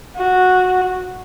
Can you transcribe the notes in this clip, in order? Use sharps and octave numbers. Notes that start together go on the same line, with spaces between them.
F#4